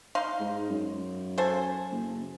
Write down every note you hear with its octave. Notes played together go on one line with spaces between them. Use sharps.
D#4 F5 C6
G#2
F#2
A4 C5 G#5
F#1